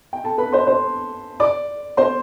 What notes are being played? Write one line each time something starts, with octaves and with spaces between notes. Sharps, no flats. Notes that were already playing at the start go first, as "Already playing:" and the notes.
G5
A4 A5
B4 B5
C5 C6
C5 C6
D5 D6
C5 C6